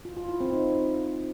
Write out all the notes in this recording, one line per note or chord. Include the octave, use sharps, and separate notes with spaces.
F4
F4
E4
C4
D#4